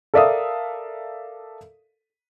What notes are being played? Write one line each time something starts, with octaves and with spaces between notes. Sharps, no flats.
A4 A#4 D5 E5 F5 D#6